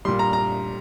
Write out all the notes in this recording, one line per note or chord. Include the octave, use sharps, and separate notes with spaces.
A#2 G3 C6
A#5
A#5